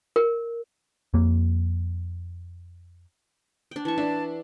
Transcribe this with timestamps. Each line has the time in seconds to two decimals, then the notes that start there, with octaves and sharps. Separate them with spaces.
0.16 A#4
1.14 F2 A#3
3.71 D4 G5
3.85 E3 A5 C#6
3.98 D4 E5